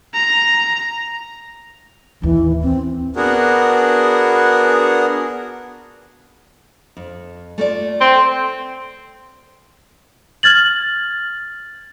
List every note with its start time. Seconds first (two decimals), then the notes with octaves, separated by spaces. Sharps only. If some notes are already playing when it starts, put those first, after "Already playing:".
0.14 A#5
2.22 A1 D#2 E3
2.63 D#2 C4
3.16 B3 D4 F#4 G#4 A#4
6.97 F2
7.58 A3 F4 D5
8.01 C4
10.43 F6 G#6 A6 F#7